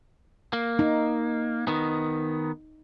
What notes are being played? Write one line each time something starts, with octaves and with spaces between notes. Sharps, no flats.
A#3
D#4
D#3 B3